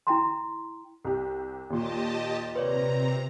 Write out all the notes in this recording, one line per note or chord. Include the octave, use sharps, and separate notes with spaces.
E4 G5 A#5 C6
C2 G4
D#2 A#2 G4 D#5 A5
C3 B4 C#5 D5 A#5